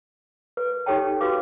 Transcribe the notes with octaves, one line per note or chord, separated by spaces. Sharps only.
B4
D#4 G4 A4 C#5 G5 A5
F#4 G4 B4 F5 D6